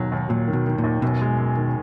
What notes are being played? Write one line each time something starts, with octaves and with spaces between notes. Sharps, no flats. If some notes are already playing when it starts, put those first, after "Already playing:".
Already playing: D#2 B2 D#3 F#3
D#2
A#2 F#3
D#3
B2
D#3
A#2
D#2
F#2 B2
G#3
F#2
D#3